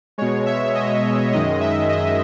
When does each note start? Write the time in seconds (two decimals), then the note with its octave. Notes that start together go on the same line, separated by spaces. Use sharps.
0.18 B2 G#3 C#5
0.46 E5
0.75 D#5
1.31 F#2 D#3 G#3 D#5
1.61 E5
1.89 D#5